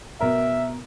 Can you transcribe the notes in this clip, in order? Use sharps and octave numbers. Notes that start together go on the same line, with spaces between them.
B2 A#4 E5